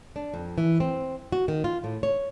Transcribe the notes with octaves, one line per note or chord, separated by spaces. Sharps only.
D4
F2
E3
C4
F#4
D#3
F4
A2
C#5